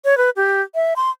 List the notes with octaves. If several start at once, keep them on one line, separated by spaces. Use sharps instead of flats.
C#5
B4
G4
E5
C6